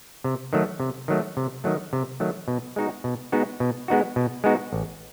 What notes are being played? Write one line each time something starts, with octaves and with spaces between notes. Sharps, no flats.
C3
D#3 F#3 A3
C3
D#3 F#3 A3
C3
D#3 F#3 A3
C3
D#3 F#3 A3
B2
G#3 B3 D#4 F#4
B2
G#3 B3 D#4 F#4
B2
G#3 B3 D#4 F#4
B2
G#3 B3 D#4 F#4
A1